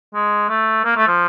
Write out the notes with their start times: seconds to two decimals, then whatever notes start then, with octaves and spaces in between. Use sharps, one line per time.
0.14 G#3
0.49 A3
0.85 A#3
0.97 A3
1.08 F3